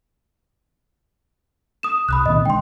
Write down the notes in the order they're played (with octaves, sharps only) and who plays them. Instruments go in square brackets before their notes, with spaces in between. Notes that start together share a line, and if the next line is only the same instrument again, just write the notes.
[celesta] D#6 E7
[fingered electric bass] C2 [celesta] B5 D#6 F#6
[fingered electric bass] A#2 D#3 C4 [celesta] D#5
[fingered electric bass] D3 G#3 D4 [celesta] G5 C6